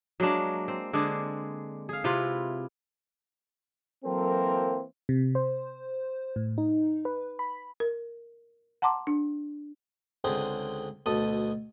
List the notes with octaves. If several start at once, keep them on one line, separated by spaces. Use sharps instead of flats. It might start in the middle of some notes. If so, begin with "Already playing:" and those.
F#3 G#3 A#3 D4
C4
D3 G#3 D4 G#4
G#4 F5
C3 E4 F4 B4
E3 F#3 A#3 C4 A4 A#4
C3
C5
A2
D#4
B4
B5
A#4
F#5 A5 A#5 C6 D6
D4
C#2 D3 C4 G#4 C5
D2 B2 A4 D#6